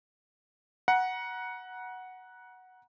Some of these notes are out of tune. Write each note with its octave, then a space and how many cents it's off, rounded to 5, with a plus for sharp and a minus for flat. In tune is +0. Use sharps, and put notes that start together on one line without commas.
F#5 +0 A#5 +40